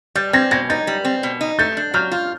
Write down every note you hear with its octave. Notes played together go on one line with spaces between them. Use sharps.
G3 G6 A6
C4 G#6 A#6
B2 G#6 A#6
D#4 G6 A6
G3
C4
B2
D#4
A3 G6 A6
D4
F#3 F6 G6
F4